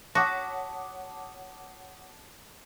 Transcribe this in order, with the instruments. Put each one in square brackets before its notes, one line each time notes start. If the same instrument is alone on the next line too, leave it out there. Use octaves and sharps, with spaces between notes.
[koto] F#4 [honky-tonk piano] C#5 F#5 B6 [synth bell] A5 D6 D#6 [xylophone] A#6